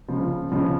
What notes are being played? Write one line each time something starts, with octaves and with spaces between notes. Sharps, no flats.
C#2 C#3 F3
C#2 C#3 F3